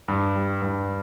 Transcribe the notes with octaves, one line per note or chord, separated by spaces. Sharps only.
G2
G3
G2